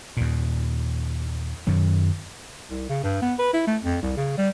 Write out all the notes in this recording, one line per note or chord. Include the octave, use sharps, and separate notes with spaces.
D#2 A#2
F#2 D#3 F#3
C2
C#3
G2
B3
B4
E4
A3
F2
C2
C#3
G3